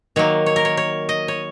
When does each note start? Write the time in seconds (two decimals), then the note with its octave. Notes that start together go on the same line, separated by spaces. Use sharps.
0.16 D#3 F#3 A#3 C#5
0.46 C#5
0.56 A#4
0.65 C#5
0.77 C#5
1.09 D#5
1.28 C#5